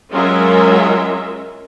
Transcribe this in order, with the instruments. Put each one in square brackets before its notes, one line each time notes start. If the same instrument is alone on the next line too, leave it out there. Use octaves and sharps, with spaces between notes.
[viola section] F#3 G#3 C#4 F4 A#4 E5